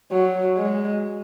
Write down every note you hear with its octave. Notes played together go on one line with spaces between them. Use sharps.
F#3
G#3